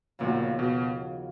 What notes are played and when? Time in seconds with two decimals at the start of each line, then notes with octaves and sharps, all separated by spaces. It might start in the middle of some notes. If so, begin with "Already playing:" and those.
0.19 D#2 A#2 C#3 F3 B3 F#4
0.59 B2